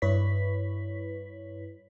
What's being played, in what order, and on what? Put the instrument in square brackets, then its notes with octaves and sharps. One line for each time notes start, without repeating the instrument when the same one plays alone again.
[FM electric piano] G2 E4 B4 C#5 B6